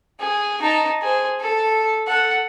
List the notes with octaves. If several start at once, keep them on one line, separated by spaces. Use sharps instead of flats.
G#4
D#4 A5
G#4 C5
A4
A4 F#5